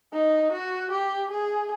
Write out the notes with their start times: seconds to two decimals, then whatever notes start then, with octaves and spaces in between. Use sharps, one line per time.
0.13 D#4
0.52 F#4
0.91 G4
1.30 G#4